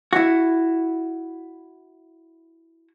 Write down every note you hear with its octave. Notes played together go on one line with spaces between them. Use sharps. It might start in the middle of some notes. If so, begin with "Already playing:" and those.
E4 F#4